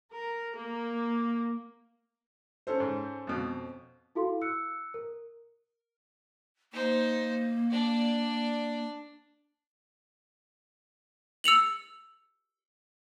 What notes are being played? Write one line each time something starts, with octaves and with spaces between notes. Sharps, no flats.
A#4
A#3
C#4 A4 C5
G#2
F2 B2
E4 F#4 A4 F5 C6
E6 F#6 C#7
A#4
A#3 D#4 C5
D4 D5
E6 C#7 F7 F#7